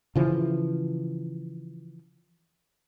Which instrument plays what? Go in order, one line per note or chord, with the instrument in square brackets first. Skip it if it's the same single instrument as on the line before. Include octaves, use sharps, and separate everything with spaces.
[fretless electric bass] C#3 E3 F3